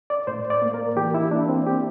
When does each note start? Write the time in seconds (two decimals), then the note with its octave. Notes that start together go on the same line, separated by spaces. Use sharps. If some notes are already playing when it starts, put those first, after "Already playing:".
0.10 D5
0.27 A2 C5
0.50 D5
0.62 A#3
0.74 A#4
0.96 E3 G4
1.14 E4
1.31 A#3 D4
1.49 C4
1.67 G4